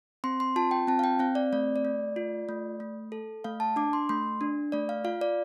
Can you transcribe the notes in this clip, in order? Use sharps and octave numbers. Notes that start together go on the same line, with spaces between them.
C4 C6
C6
F4 A5
G5
C4 A5
F5
G5
C4 F5
D5
A3 D5
D5
A3
F4
A3
A3
A4
A3 F5
A5
D4 D6
C6
A3 C6
D4
A3 D5
F5
F4 F5
D5